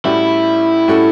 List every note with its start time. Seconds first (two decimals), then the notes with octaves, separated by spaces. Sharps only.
0.05 A2 G3 C#4 E4 F#4 A4
0.88 A2 G3 C#4 F#4 A4